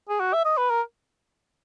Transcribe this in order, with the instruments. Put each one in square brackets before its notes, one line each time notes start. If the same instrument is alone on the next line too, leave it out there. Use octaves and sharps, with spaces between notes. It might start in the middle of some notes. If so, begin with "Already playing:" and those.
[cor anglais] G#4
F#4
E5
D#5
B4
A#4